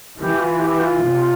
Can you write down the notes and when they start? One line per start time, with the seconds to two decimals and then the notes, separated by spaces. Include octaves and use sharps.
0.19 E3 G4
0.40 F4
0.60 G4
0.81 F4
1.01 C3